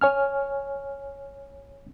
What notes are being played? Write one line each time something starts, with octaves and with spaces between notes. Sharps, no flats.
C#5 G#5 F6